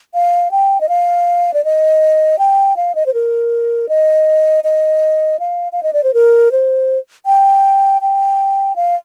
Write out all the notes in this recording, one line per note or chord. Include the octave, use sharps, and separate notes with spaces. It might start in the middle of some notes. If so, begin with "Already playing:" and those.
F5
G5
D#5
F5
D5
D#5
G5
F5
D#5
C5
A#4
D#5
D#5
F5
F5
D#5
D5
C5
A#4
C5
G5
G5
F5